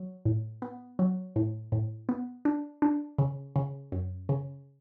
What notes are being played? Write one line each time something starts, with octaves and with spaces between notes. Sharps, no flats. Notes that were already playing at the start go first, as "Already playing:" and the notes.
Already playing: F#3
A2
B3
F#3
A2
A2
B3
D4
D4
C#3
C#3
F#2
C#3